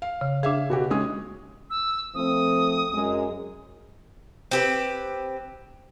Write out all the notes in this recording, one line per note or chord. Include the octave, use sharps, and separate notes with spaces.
F5
C#3
D4 G#4 E5 F5
B2 F#4 G4
G#3 C#4 D#6
E6
F3 A3 C4 D#6
F#2 G#3
C4 G4 B4